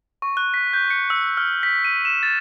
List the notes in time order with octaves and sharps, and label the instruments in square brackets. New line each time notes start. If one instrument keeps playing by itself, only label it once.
[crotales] C#6
F#6
B6
G6
C#7
E6
F6
B6
D#7
E7
A6